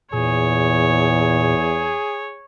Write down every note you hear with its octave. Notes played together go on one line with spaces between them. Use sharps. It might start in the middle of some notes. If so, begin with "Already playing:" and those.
E2 A#2 G#4 C#5